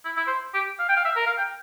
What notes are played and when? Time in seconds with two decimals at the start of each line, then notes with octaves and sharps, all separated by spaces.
0.05 E4
0.16 E4
0.27 C5
0.54 G4
0.79 F5
0.89 G5
0.96 F5
1.05 E5
1.16 A#4
1.26 F5
1.38 G5